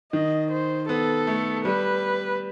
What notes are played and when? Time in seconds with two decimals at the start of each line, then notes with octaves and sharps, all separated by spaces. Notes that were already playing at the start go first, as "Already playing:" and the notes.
0.13 D#3 D#5
0.51 C5
0.89 B3 A4
1.27 A3
1.65 G3 B4